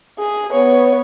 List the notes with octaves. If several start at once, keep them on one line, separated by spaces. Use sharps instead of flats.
G#4
B3 C#5